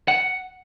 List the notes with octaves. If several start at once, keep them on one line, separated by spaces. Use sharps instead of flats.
F#5